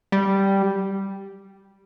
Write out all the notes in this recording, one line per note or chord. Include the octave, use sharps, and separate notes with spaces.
G3